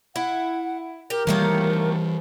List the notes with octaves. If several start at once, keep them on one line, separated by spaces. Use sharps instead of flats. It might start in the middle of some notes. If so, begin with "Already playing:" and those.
E4 F#5
G4 A#4
D#3 E3 G3 A3 A#3